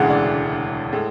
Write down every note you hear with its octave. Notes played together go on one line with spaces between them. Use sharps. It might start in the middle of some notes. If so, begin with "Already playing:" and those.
Already playing: E1 D2 C#3 E3 G#3 F#5
D5
A2 G#3